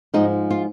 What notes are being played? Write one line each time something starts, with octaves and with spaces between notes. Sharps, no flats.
G#2 F3 G#3 D#4
F4